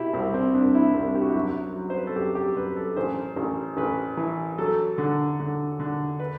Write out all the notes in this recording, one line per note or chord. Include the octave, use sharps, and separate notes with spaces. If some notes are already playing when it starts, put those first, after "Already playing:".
Already playing: B2 E4 G4
C2 C4
C4
C2 D4
E4
C2 D4
G4
F#4
E4
F#2 F#4
F#3
C5
B4
A4
F#2 G4
G4
F#2 B4
A4
A1 C5
A1
A1 B4
E3
F#3 A4
D3
D3
D3
B4